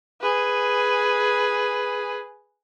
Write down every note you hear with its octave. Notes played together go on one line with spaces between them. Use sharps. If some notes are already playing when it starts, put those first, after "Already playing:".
G#4 B4